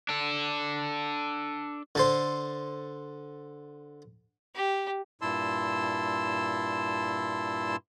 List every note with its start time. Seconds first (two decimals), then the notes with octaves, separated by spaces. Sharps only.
0.09 D4 A4
1.95 D3 A4 C5
4.56 G4
5.22 G2 A#2 E4 A5 C6 E6